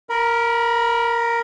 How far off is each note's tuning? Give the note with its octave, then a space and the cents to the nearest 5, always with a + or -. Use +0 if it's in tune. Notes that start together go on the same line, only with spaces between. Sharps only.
A#4 +0 B5 -35